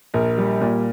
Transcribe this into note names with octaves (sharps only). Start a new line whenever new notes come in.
A#1 A#4
G3
A#2